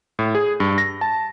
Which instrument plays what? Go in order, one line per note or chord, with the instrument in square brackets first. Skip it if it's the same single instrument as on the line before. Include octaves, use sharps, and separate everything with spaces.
[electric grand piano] A2
G#4
G2
A#6
A5